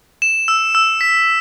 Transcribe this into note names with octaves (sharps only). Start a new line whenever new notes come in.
E7
E6
E6
B6